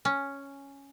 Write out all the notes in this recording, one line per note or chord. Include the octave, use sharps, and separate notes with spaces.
C#4